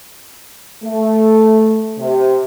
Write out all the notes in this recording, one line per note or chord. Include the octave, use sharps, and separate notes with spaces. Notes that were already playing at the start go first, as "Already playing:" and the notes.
A3
C3